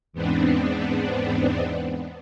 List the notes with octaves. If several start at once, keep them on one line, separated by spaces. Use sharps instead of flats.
E2 G#2 B3 C4 D4